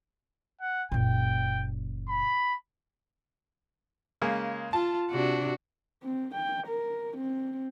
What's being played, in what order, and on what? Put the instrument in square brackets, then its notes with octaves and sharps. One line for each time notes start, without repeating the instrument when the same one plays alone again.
[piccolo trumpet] F#5
[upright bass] F#1 A#2 [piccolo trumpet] G5
[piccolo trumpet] B5
[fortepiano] C#3 G#3 A#3
[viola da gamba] F4 [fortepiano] A5
[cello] C3 D4 [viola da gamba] F#4
[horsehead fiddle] C4
G5
A#4
C4